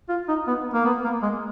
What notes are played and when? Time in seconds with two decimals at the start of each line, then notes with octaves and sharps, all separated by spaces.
0.09 F4
0.28 D#4
0.47 B3
0.74 A#3
0.85 B3
1.04 A#3
1.22 G#3